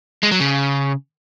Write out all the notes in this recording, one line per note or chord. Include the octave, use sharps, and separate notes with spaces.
G#3
F#3
C#3